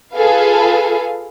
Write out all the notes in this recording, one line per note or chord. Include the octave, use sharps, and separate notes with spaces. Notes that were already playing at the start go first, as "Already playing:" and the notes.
F4 G#4 A4 B4 F5